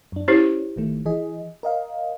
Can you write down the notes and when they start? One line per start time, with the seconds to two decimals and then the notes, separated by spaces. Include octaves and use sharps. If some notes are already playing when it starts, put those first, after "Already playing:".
0.12 F#2 D4
0.28 C#4 E4 G4 C5
0.76 G#1 D#3 A3
1.06 E3 G#4 D#5
1.63 A#4 D#5 F5